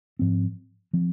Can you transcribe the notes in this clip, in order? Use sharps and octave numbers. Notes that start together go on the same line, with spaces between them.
G#2 F3 C4
F3 C4